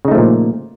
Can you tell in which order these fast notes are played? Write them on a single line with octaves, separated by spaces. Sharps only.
C#3 D#4 A3 F3 A#2